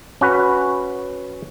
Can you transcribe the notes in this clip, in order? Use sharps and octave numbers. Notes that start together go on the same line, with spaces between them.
C#4 F#4 B4